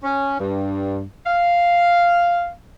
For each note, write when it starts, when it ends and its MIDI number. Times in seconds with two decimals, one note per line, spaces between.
0.03 0.34 61
0.39 1.01 43
1.26 2.50 77